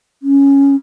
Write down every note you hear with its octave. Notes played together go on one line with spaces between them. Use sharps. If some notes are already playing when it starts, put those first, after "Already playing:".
C#4